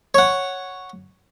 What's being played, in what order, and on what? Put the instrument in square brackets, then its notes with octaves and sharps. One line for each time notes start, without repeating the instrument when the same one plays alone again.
[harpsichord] C#5 F#5